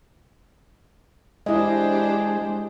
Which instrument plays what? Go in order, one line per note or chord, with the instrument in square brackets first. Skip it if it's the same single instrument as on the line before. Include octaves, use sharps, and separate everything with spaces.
[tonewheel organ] G#3 [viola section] D4 G4 C5 [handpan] E4 D#5